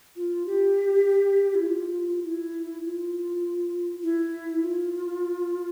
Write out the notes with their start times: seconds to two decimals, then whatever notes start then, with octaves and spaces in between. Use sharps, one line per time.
0.17 F4
0.46 G4
1.55 E4
1.66 F4
2.24 E4
2.84 F4
4.03 E4
4.62 F4